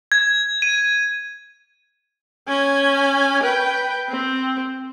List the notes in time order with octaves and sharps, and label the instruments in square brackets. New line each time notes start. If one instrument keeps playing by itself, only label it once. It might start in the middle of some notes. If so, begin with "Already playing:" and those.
[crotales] G#6
D#7
[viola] C#4 G#5
B4 G5
C4